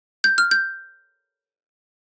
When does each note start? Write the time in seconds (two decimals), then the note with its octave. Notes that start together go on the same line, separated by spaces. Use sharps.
0.24 G6
0.38 F6
0.51 G6